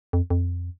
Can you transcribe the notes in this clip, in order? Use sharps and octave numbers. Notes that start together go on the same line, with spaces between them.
F2
F2